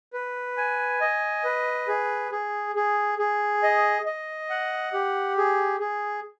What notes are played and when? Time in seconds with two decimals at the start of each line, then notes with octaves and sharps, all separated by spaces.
0.13 B4
0.57 G#5
1.01 D#5
1.44 B4
1.88 G#4
2.32 G#4
2.76 G#4
3.19 G#4
3.63 D#5
4.06 D#5
4.50 F#5
4.93 G4
5.37 G#4
5.80 G#4